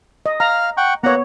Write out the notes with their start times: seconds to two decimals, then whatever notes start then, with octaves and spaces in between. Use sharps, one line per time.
0.26 D#5
0.40 F5 A#5 F6
0.77 F#5 G5 C#6
1.03 A#3 B3 C#5 F#5 A#5